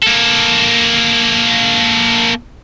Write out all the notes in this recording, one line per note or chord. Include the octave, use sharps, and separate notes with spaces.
A#3 A4